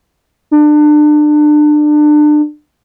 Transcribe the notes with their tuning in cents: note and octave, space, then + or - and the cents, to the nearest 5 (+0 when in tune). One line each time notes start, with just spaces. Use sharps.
D4 +30